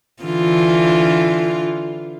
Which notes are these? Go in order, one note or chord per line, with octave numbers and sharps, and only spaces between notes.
D3 E3 F4